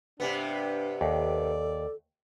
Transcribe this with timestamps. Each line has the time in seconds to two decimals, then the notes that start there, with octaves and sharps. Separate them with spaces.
0.20 G2 C3 B3 D4
1.01 D#2 A4 D5